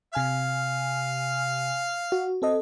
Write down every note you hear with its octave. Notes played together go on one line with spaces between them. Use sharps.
C3 F5 G#5 F6
F#4
C4 A4 D#5